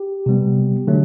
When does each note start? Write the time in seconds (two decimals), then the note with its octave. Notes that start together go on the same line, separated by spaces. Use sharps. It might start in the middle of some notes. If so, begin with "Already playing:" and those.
Already playing: G4
0.26 C3 G3 B3
0.87 D3 F#3 A3